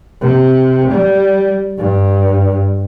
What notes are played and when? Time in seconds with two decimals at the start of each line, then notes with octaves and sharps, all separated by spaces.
0.22 C3
0.91 G3
1.78 G2